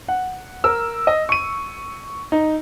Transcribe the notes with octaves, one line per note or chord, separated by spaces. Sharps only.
F#5
A#4 E6
D#5
C#6 D#7
D#4